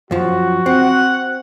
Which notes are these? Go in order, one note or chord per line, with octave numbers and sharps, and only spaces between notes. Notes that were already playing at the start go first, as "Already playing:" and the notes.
F#2 F3 F#4
C4 F#5